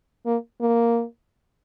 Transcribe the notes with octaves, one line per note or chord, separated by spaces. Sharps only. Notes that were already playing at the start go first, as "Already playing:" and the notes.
A#3
A#3